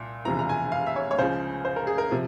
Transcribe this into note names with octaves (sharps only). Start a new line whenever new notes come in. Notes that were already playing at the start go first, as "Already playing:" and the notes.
Already playing: C2 A#2
E1 E2 C3 F3 A#5
A#5
G#5
F5
E5
C#5
C#5
C#2 C#3 F3 C5
C5
A#4
G#4
A#4
C3 F3